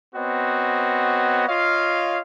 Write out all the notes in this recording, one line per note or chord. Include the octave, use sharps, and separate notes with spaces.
B3 C4 F#4 C#5 D#5
F4 C#5 D#5 F5